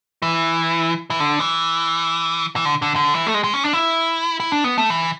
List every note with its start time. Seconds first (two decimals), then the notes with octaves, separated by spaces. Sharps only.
0.22 E3
1.10 E3
1.20 D3
1.39 E3
2.56 E3
2.65 D3
2.82 D3
2.96 D3
3.15 E3
3.27 A3
3.34 G#3
3.44 G#3
3.54 C#4
3.64 D4
3.73 E4
4.40 E4
4.52 D4
4.64 B3
4.78 A3
4.90 E3